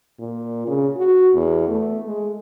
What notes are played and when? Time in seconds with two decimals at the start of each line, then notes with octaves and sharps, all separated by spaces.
0.20 A#2
0.67 C#3
0.96 F#4
1.34 E2
1.69 A3
2.07 G#3